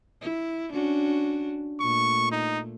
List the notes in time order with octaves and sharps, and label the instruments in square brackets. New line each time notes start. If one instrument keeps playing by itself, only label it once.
[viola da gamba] E4
C#4 D4 F#4
[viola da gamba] A#2 A3 [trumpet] C#6
[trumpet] D#4